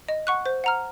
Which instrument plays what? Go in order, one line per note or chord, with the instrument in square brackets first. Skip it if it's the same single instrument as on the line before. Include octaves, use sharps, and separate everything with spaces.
[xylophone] D#5
F#5 C#6 F#6
C5
F#5 A#5 F6